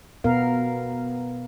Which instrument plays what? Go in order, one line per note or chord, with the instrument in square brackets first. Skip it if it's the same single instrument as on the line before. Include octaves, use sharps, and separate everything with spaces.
[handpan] B2 B3 A#4 F5